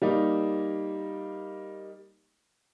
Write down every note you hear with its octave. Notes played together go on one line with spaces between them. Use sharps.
G3 A#3 D#4